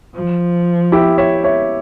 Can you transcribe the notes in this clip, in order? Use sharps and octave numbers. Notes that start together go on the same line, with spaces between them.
F3
E4 G4
C#5 E5
C#5 E5